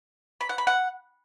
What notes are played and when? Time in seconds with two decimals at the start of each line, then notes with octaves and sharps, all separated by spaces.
0.41 B5
0.49 F#5
0.58 B5
0.67 F#5